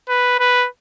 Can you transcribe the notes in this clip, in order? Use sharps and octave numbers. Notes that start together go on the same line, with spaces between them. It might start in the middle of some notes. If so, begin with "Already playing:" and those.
B4
B4